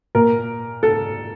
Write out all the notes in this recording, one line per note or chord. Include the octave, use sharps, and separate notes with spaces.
A#2 A#4
A4